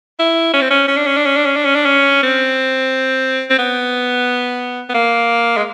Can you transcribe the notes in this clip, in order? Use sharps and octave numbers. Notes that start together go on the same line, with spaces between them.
E4
C#4
C4
C#4
C#4
D4
C#4
D4
C#4
D4
C#4
D4
C#4
D4
C#4
C4
C4
B3
B3
A#3
G#3